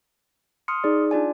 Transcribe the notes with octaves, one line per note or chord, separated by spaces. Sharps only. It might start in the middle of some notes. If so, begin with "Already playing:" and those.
C6 D#6 F6 C#7
D#4 G#4 D5
D4 F4 D5 G#5